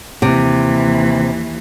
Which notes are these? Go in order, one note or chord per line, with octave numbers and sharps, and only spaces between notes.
D#2 C3 E3